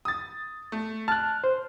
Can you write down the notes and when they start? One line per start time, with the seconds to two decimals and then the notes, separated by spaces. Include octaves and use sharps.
0.05 D#6 A6
0.72 A3
1.08 A5 F6 F#6
1.44 C5